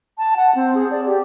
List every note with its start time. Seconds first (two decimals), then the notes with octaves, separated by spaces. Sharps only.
0.18 A5
0.37 F#5
0.55 C4
0.75 G#4
0.91 D5
1.07 G4